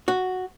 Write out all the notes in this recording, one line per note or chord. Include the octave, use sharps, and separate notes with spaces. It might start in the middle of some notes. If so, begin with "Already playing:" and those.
F#4